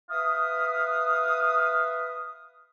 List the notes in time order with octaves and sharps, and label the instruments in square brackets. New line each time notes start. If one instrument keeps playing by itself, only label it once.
[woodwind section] B4 E5 F5 D#6